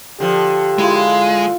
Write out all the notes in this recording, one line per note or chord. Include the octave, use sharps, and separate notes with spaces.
D3 F3 G4
G#3 E4 F4